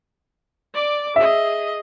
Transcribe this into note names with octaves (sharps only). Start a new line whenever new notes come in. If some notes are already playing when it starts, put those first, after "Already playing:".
D5 D6
G#4 D#5 E5